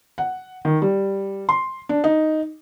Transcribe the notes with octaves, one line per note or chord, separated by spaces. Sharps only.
F#5
D#3
G3
C6
D4
D#4